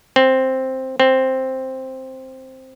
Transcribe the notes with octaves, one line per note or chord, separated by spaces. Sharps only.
C4
C4